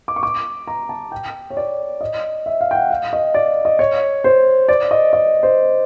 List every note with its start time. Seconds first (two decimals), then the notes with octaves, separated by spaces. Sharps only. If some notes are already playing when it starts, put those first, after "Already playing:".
0.08 D6
0.16 C#6
0.23 D6
0.67 A#5
0.89 A5
1.12 G5
1.50 C#5
1.57 D5
2.01 D#5
2.46 E5
2.61 F5
2.71 G5
2.75 F#5
2.90 F5
3.13 D#5
3.34 D5
3.65 D#5
3.79 C#5
4.24 C5
4.68 D5
4.91 D#5
5.13 D#5
5.43 C5